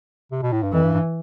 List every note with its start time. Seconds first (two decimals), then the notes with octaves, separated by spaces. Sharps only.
0.31 C3
0.43 B2
0.52 A2
0.63 G2
0.73 F2 E3
0.83 G2
0.93 G2